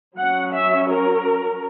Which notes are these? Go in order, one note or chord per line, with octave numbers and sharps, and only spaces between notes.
F#3 C#4 F#5
E5
A#4